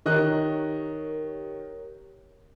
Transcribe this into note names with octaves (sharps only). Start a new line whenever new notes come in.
D#3 G4 A#4 C#5 D#5 F#6